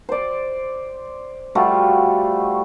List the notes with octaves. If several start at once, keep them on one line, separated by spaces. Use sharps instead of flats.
C5 D5
G3 A3 F4 F#4